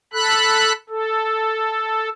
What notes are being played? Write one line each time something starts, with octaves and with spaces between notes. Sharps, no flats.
A4 B5 F#6
A4